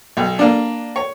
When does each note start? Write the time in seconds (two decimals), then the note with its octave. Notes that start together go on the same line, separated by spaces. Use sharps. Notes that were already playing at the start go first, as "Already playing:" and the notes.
0.17 B1
0.39 A#3 D4
0.96 C#5